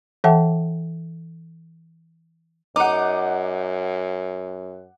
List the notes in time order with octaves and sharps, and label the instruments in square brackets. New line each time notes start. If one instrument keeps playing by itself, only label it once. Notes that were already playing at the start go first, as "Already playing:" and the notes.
[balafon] E3 A4 E5 F#5 G5 A5
[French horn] F#2 [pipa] D#4 [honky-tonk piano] F#5 D6